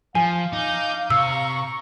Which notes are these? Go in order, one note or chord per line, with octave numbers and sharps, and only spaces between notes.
F3 F5 G#5
D#4 D6 G6
C3 A#5 C#6 E6